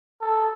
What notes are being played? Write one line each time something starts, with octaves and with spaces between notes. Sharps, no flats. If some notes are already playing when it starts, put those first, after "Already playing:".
A4